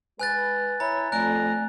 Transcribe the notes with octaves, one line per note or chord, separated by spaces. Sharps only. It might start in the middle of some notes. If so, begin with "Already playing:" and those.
G#3 B4 G#5 F#6 A6
E4 C#5 A#5
F2 A3 D5 G#5 A#5 F#6